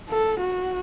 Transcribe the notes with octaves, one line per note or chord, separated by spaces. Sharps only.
A4
F#4